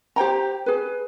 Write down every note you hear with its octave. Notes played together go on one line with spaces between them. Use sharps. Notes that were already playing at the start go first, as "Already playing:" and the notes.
G4 C5 G5 A#5
G#4 B4